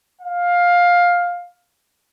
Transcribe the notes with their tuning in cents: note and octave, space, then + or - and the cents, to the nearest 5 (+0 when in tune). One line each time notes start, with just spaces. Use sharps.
F5 +15